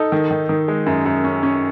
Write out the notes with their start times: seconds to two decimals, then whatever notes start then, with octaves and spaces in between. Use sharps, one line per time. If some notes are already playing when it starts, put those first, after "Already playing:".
Already playing: D#4 A4
0.12 D#3
0.31 D#3
0.49 D#3
0.68 G#3
0.86 F#2
1.06 F#2
1.24 C#4
1.43 C#4